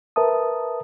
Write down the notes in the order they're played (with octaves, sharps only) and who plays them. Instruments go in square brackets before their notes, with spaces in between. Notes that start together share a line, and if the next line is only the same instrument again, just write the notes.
[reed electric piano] A#4 B4 E5 A5 D#6